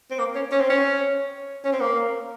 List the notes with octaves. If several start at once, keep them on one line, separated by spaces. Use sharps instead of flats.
C4
A#3
C#4
C#4
C4
C#4
C#4
C4
A#3